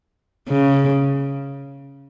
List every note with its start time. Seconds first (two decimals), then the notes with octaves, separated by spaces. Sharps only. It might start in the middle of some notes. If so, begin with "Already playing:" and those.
0.49 C#3